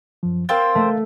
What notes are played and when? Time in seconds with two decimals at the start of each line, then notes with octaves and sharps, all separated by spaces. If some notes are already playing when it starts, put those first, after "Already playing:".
0.23 F#2 F3
0.49 C4 A#4 C5 F5 G5 A6
0.75 A3